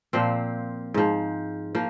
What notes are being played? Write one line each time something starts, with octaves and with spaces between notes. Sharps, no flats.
A#2 F3 C4
G#2 F3
F3 A#3